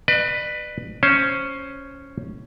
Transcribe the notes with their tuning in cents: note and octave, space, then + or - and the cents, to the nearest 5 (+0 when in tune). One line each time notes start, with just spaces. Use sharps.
B4 +0 D5 +40
C#4 +0 C5 +15